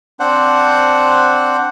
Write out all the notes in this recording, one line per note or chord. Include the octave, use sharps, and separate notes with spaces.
C4 D4 C5 F#5